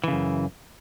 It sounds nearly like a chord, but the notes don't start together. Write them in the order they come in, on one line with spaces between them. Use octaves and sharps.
E3 C#3 F#2